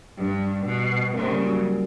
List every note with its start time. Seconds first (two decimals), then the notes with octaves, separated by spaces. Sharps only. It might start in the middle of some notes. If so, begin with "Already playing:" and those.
0.17 G2 G3
0.65 B2
1.14 C#3 A#3
1.30 G3
1.46 F#3